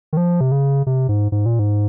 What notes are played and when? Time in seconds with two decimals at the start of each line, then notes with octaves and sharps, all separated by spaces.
0.13 D#3
0.17 F3
0.41 C3
0.52 C#3
0.87 C3
1.09 G#2
1.32 G#2
1.46 A#2
1.59 G#2